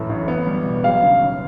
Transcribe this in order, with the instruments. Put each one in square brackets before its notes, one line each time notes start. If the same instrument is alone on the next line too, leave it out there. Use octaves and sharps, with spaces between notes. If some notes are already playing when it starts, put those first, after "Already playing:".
Already playing: [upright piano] F#2 A2 E3
A1
B3
G3
B2
[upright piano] F#3 [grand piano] F5
[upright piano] C#3
D#2